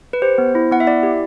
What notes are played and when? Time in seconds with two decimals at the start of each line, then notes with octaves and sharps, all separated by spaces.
0.13 B4
0.22 G4 C5
0.38 B3
0.55 E4
0.71 B3 F#5
0.80 E5
0.87 E4 D5
1.03 G4